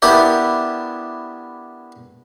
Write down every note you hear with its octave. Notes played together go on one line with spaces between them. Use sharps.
B3 D4 E4 G4 A#4